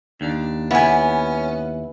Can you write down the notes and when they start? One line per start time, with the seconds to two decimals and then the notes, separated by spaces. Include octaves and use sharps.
0.21 D#2 D4
0.71 B3 C#4 E4 G#5